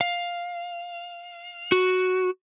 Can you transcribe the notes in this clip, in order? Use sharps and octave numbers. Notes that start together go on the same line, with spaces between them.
F5
F#4